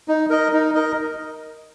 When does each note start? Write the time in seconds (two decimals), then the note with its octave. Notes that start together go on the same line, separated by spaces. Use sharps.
0.08 D#4
0.30 A#4 D#5
0.53 D#4
0.74 A#4 D#5